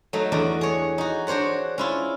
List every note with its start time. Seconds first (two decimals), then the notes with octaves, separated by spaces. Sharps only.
0.13 F#3 A3 D#4
0.32 E2 D4 F#4 D5 D#5
0.61 G#4 C#5
0.98 D#4 F#4
1.27 D4 F#4 C5 C#5 F#5
1.78 C#4 E4 F4